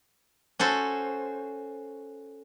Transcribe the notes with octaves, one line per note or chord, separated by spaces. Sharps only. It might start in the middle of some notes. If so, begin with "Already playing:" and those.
C#4 F#4 A4 C5